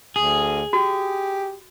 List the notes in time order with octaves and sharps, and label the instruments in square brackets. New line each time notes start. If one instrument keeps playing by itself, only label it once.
[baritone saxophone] D2 [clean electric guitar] G#4
[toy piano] F#4 [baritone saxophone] G4